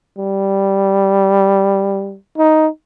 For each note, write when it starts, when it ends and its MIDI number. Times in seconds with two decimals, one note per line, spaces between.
0.18 2.16 55
2.38 2.68 63